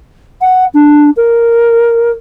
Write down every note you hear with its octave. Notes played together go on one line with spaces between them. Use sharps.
F#5
D4
A#4